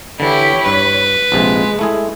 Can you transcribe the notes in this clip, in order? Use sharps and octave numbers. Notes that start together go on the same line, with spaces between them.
D3 E3 E4 G4 C#5 B5
G2 B4
A#1 C3 G#3
A3 E4 G#4